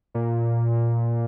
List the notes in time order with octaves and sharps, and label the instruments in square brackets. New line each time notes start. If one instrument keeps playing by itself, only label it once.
[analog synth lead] A#2